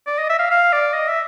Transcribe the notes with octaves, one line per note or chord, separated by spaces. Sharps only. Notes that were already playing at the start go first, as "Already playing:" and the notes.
D5
D#5
E5
F5
F5
D5
D#5
E5